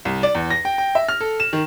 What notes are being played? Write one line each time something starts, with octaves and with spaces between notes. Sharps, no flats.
C2
D5
E2
A#6
G5
G5
E5
F6
A4
E7
D#3